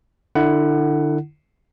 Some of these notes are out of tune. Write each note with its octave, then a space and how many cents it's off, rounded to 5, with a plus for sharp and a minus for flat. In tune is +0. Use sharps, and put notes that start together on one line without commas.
D3 +25 E4 +0 F#5 +15